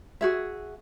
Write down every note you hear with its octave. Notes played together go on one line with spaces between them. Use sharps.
F#4 G#4 E5